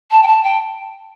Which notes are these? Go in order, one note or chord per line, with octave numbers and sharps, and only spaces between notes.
A5
G5
A5
G5